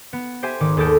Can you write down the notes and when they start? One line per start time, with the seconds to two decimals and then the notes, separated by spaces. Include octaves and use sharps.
0.13 B3
0.43 G4 C5 E5 G#5
0.60 G#1 D#3 D6
0.77 D#2 G#4 A4 D6 G6 D7